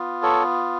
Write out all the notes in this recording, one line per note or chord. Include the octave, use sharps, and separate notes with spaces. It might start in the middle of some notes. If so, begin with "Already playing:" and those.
Already playing: B3 F4
A4 C#5